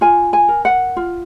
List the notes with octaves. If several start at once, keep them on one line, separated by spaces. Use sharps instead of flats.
F4 G#5
G#5
A#4
F#5
F4